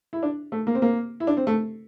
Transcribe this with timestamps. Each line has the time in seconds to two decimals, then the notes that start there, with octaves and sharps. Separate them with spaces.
0.13 E4
0.23 D4
0.52 A3
0.67 A#3
0.75 C4
0.82 A#3
1.20 E4
1.27 D4
1.37 C4
1.47 A3